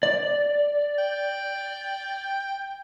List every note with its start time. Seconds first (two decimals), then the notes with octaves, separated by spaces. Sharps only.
0.03 D5
0.99 G5